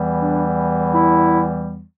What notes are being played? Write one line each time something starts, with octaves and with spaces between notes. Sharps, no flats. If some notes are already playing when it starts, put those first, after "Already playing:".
Already playing: E2 E3 G3
D4
E4